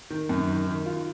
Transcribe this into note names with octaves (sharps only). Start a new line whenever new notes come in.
D#3
F#2
D#3
D#3
F4